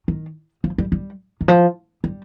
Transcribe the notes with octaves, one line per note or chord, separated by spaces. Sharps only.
D#3
F3
G3
G3
D#3
F3
G3